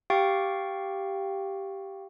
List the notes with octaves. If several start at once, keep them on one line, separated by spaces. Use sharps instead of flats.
G4 F5 G5 C#6 A6 D7